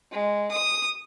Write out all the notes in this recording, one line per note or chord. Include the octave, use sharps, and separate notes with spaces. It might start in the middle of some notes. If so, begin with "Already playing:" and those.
G#3
D#6